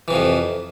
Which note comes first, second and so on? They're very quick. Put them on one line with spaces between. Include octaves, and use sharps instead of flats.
E3 C3 F3 F2